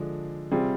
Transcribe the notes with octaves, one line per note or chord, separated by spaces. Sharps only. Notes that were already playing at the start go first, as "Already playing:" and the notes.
Already playing: D3 F3 G#3 D4
C3 G3 C4 F4 G#4